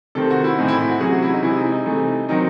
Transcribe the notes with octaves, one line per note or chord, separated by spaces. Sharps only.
C3 D#3 A3 C4 A4
F#4
E4
A2 E3 C4 D#4
E4
E4
F#4
C3 F#3 C#4 G#4
F#4
E4
D#4
C3 E3 G#3 E4
D#4
D#4
C3 E3 A3
D#3 F#3 C4 D#4